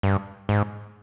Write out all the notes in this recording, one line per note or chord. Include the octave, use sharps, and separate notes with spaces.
G2
G#2